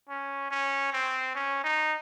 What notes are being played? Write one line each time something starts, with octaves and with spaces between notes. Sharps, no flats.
C#4
C#4
C4
C#4
D#4